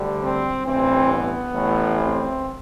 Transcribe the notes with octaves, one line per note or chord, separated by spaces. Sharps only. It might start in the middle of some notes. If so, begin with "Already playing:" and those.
Already playing: D2 D3 G3
C4
A1 G2 E3 C4
B3
A1 A2 E3 G3
C4